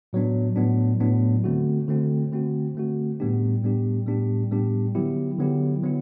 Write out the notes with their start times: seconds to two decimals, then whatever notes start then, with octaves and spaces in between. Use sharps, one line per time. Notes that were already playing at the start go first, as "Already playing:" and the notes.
0.13 A2 F#3 B3 D4
0.56 A2 F#3 B3 D4
1.00 A2 F#3 B3 D4
1.44 D3 A3 C4 F#4
1.88 D3 A3 C4 F#4
2.32 D3 A3 C4 F#4
2.75 D3 A3 C4 F#4
3.20 A2 G3 B3 D4 G4
3.63 A2 G3 B3 D4 G4
4.07 A2 G3 B3 D4 G4
4.51 A2 G3 B3 D4 G4
4.95 D3 F#3 B3 E4 G4
5.38 D3 F#3 B3 E4 G4
5.83 D3 F#3 B3 E4